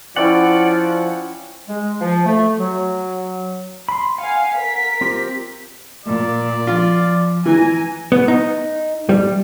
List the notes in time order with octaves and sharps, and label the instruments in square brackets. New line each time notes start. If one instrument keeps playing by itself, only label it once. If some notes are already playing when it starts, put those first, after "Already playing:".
[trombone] F3 [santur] C#4 E4 G5 [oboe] D5 [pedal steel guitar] F#5
[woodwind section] G#3
F3
A3
F#3
[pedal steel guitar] B5 C6
[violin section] F5 G#5 [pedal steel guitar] F#5
[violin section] A#4 B6
[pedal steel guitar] C4 F4 G4
[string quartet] A#2 [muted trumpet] D5
[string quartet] F3 [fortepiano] F4
[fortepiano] E3 [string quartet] G#5 A#5
[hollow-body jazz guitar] B3
D#4
G3